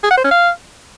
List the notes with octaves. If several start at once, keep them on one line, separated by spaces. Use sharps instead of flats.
G#4
F#5
C5
C#4
F5